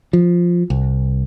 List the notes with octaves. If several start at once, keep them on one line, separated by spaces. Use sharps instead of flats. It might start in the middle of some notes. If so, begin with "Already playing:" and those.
F3
C2